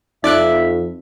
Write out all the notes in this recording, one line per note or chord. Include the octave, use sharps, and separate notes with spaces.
F2 D#4 D5 E5 D6 F#6